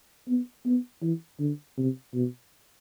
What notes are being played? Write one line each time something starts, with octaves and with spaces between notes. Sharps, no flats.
B3
B3
E3
D3
C3
B2